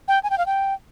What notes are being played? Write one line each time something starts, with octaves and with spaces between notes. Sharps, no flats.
G5
G#5
G5
F5
G5